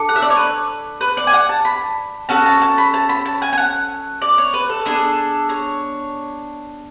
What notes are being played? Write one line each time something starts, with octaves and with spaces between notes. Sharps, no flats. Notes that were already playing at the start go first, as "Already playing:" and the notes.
Already playing: D4 A4
F#5
E5
D5
C#5
B4
B4
D5
G#5
F#5
A5
B5
C#4 F#4 A4 A5
A5
A5
B5
A5
B5
A5
G#5
G#5
F#5
D5
C#5
B4
A4
B3 D4 G#4
C#5